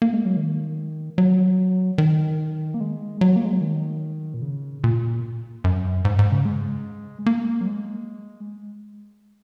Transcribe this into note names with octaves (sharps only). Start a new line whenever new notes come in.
A#3
G#3
F#3
D#3
F#3
D#3
A#3
G#3
F#3
A#3
G#3
F#3
D#3
A#2
C#3
A#2
F#2
G#2
G#2
C#3
G#3
A#3
F#3
G#3